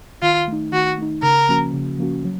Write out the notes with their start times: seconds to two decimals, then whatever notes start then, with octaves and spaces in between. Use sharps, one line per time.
0.22 D#3 F4
0.48 A3 D#4
0.72 D#3 F#4
0.98 A3 D#4
1.23 C#3 A#4
1.49 F3 A#3 C#4 F#4
1.73 C#3
1.99 F3 A#3 C#4 F#4
2.25 F#3